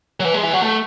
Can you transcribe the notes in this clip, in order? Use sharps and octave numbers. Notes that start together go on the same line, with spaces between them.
F#3
E3
G#3
E3
F#3
A3